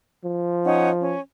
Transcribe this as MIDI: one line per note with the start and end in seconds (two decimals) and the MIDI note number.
0.25 1.15 53
0.64 0.89 61
0.64 0.89 63
0.64 0.89 78
1.00 1.19 61